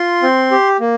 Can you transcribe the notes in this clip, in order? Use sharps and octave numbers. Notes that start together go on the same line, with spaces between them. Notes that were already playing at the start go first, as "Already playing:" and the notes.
Already playing: F4 C6
C4
G4
A#3